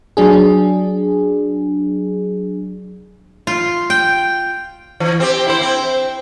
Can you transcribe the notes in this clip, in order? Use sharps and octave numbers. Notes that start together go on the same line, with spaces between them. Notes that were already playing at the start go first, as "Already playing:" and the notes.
F#3 D4 G#4
F4
G5
E3
C4 G4
E4 C5
C4